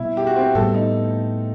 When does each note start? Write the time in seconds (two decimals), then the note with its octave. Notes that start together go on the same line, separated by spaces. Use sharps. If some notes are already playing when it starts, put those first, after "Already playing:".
Already playing: B2 G3 B3 E4
0.17 G4
0.27 F#4
0.36 C4
0.55 A2 G3 B3 A4
0.74 D#4